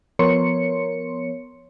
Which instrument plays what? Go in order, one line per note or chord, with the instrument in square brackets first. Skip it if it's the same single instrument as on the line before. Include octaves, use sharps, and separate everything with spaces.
[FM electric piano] F3 B3 A#4 C#5 C6 C#7